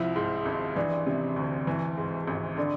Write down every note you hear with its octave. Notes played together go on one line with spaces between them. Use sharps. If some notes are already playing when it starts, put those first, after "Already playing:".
Already playing: C2 F3 E4
G#2
G#1
E3 D4
C3
D2
E3
G#2
G#1
D3 D4